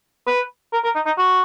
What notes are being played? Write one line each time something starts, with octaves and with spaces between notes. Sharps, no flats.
B4
A#4
A#4
D#4
D#4
F#4